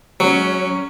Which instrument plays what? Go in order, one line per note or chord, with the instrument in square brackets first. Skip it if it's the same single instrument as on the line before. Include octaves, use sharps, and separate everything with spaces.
[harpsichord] F#3 [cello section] G#3 C#4